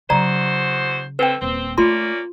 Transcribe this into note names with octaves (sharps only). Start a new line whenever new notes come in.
E2 C#3 F#3 F#4 C5 D5 A#5
D3 A3 C4 B4 G5
D#1 C4
A3 A#3 C#4 F4 D5 C6